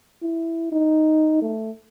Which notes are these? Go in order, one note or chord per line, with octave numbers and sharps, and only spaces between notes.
E4
D#4
A3